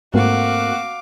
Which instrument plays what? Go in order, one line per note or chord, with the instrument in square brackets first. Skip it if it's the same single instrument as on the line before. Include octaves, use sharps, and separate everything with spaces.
[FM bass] G#2 [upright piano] A3 A#3 C4 [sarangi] F#4 [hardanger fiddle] F5 D6